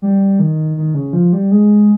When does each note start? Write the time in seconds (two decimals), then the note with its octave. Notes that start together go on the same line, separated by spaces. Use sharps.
0.02 G3
0.39 D#3
0.77 D#3
0.94 C#3
1.13 F3
1.33 G3
1.52 G#3